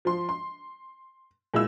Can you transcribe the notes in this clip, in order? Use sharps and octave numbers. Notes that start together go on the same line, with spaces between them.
F3 C6
C6
A#2 G#3 E4 E6